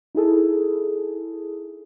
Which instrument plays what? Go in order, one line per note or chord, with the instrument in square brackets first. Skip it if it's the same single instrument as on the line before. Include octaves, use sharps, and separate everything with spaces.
[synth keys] D#4 E4 G#4 A4